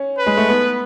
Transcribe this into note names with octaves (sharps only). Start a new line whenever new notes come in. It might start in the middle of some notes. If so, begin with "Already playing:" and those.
Already playing: C#4
B4
G#3
A3
B3